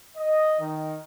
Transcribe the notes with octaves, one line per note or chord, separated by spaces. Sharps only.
D#5
D#3